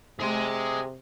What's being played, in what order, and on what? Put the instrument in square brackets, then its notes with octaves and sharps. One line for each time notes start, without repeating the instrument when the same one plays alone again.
[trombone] C3 [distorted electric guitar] G#4 C6